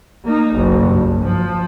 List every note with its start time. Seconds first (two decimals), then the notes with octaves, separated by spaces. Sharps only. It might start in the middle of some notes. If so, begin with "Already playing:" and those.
0.25 A#3 D#4
0.55 F#1 B1
0.88 G2
1.23 F3